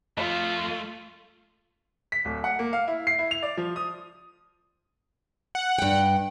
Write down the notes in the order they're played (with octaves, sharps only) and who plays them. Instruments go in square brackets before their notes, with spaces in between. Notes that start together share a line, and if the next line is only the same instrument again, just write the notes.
[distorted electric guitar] F2 F3 [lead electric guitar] A3 [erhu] F4
[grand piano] B6
D1
F#5
A#3
F5
E4
C7
E4
F7
D5
F3
D#6
[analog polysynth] F#5
[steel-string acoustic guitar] G2 G5